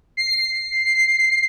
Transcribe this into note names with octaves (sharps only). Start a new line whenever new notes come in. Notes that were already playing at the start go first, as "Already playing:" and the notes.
C7